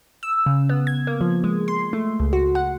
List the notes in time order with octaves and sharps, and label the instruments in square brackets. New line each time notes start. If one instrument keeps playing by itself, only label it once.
[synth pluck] E6
C#3
B3
G#6
A#3
F3
G#3
C6
A3
C#2
F#4
F#5